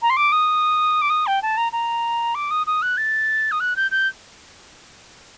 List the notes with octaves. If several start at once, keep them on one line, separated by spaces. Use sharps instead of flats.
A#5
C6
D6
D#6
D6
D#6
G5
A5
A#5
A#5
D6
D#6
D#6
F#6
A6
D#6
F#6
G6
G6